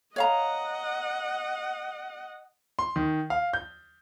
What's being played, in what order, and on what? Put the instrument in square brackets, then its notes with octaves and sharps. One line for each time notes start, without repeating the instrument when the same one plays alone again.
[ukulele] C#5 F5 A#5 [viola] D#5 F#5
[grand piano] C6
D#3
F5
G6